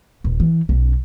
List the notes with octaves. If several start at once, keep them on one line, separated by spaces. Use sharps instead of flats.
D#1
E3
B1 C#4